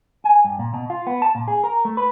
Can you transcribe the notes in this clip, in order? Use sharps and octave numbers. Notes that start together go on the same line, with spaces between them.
G#5
G2
A#2
B2
F4
B3
A5
A#2
G#4
A#4
A3
B4